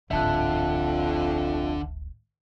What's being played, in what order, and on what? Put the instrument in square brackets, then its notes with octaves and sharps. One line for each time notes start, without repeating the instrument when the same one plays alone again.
[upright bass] D1 G#1 [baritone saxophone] F2 [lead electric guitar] D3 [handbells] E5 A5 F#6